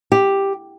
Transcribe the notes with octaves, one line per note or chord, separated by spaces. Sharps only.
G4